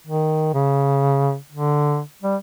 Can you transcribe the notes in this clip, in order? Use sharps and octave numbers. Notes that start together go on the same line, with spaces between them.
D#3
C#3
D3
G3